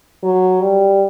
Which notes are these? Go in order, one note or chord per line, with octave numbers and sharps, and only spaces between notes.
F#3
G3